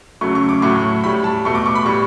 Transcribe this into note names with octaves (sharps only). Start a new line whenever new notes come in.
F#2 C#3 F#3 A3 C#6
C#6
D6
A2 F#3 A3 C#6
A2 G3 B5
A5
B2 A3 C#6
D6
C#6
B5
A2 G3 C#6